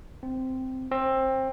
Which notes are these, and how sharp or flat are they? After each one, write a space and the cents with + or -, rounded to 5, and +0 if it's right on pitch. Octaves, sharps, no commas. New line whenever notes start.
C4 -10
C4 +20